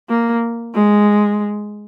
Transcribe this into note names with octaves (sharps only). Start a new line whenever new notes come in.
A#3
G#3